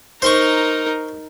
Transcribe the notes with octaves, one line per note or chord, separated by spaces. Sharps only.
D#4 A#4 C5 C6 C#6